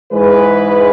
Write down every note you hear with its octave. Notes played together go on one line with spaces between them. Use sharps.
G#2 E3 G#3 B4